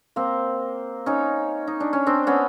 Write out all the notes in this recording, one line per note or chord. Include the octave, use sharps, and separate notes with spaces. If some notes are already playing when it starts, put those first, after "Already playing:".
A#3 C4
C#4 D#4
D#4
D4
C#4
C4 D4
B3 C#4